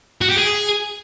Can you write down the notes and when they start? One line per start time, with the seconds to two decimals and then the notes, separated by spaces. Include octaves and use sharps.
0.22 F#4
0.30 G4
0.38 G#4